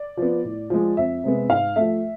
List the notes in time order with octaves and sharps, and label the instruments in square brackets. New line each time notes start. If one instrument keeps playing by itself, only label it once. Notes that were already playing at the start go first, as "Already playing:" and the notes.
Already playing: [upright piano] D5
F3 B3
A2
F3 G#3
F2 E5
C3 G#3 B3
G#2 F5
F3 A3 E5